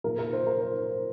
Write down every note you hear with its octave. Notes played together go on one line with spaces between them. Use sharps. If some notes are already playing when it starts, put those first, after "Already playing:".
A#2 F3 A#3 A#4
A#4
C5
A#4
C5
C5